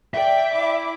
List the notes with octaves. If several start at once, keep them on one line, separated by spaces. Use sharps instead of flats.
D5 E5 G5
E4 D5 D6